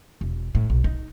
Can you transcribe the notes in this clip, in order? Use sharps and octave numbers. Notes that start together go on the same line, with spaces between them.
E1
A2
B1
D#4